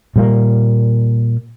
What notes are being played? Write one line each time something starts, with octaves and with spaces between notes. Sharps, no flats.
A#2 G3 A#3